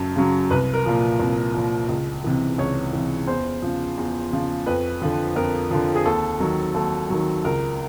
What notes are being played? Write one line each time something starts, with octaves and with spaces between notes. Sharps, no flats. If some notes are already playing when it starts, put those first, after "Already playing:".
Already playing: F#2 C#3 F#3 A4
C#3 F#3
C2 B4
A#4
A#2 F3
C2
A#2 F3
C#2
C3 E3
C#2 C#5
C3 E3
E2 C5
C#3 F3
E2
C#3 F3
F2 B4
D3 F3
F2 A#4
D3 F3
G#4
D#2 A4
D#3 F#3
D#2 A4
D#3 F#3
C#2 A#4